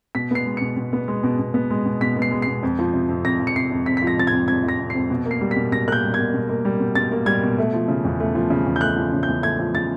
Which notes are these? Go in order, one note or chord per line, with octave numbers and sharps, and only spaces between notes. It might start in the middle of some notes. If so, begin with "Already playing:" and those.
B2 B6
B3 C7
G#3
B2 C#7
B2
B3
G#3
B2
B2
B3
G#3
B2
B2 B6
B3
C7
G#3
B2 C7
F2
F3
C3
F2
F2 A#6
F3
C#7
C3 C7
F2
F2 B6
F3 B6
A#6
C3 A6
G#6
F2
F2 G#6
F3 A#6
C3
C7
F2
B2
A#3
C7
G3
B6
B2
B2 A#6
A#3 F#6 G6
G3
B2 G#6
B2
A#3
G3
B2
B2 A6
A#3
G3 G#6
B2
A3
F3
C#3
E2
A3
F3
C#3
E2
G6
A3 F#6
F3
C#3
G6
E2
A3 G#6
F3
C#3 A6